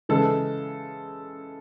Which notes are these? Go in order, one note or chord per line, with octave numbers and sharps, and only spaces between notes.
C#3 E3 G#3 A4